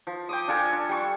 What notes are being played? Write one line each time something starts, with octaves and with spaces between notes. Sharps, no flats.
F3
G5 D6 D#6
D4 F4 A4 G#5
D4
G3 C#6